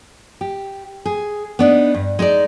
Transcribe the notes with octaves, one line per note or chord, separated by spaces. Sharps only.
G4
G#4
B3 D4 D#4
G2
G#3 D#4 A4 D5